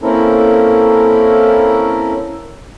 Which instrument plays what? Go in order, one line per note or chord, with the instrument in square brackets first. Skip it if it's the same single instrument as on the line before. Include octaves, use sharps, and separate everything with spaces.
[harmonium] A#3 C4 C#4 E4 A4 A#4